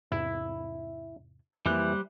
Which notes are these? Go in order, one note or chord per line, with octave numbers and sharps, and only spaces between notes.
E2 G#2 C3 E4
F2 E3 G3 A#3 C5 F#6